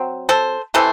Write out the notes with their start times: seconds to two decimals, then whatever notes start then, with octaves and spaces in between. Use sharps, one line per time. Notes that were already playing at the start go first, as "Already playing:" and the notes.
Already playing: F#3 C4
0.29 A4 C5
0.74 C3 E3 A3 A4 C5